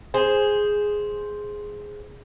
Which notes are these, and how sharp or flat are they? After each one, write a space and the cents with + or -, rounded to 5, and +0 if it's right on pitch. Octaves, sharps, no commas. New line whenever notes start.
G#4 +0 C5 +0